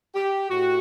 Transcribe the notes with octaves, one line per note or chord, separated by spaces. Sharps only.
G4
A2 F#4